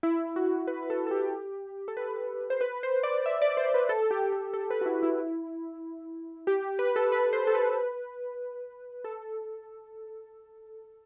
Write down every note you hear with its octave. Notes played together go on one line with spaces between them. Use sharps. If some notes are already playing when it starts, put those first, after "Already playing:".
E4
F#4
B4
B4
A4
A4
G4
A4
B4
C5
B4
C5
D5
E5
D5
C5
B4
A4
G4
A4
A4
B4
F#4
E4
E4
G4
G4
B4
A4
B4
C5
A4
B4
A4